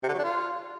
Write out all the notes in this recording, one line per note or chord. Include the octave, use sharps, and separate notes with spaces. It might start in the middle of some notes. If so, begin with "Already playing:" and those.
C3
D3
F#3
D4
F4